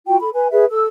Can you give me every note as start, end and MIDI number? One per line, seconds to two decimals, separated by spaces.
0.07 0.17 65
0.07 0.17 66
0.07 0.17 79
0.20 0.30 69
0.20 0.30 83
0.34 0.48 71
0.34 0.48 80
0.51 0.64 68
0.51 0.64 71
0.51 0.64 76
0.71 0.87 69
0.71 0.87 88